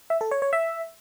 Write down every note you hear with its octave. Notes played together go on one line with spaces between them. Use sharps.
E5
A4
C#5
C#5
E5